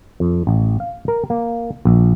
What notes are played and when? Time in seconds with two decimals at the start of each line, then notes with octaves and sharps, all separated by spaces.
0.20 F2
0.47 A1
0.80 F5
1.08 A#4
1.30 A#3
1.85 A#1